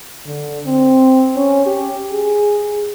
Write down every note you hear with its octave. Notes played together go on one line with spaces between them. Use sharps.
D3
C4
C#4
G4
G#4